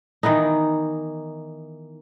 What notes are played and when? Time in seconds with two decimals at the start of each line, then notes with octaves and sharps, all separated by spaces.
0.23 D#3 E3 B3 D#4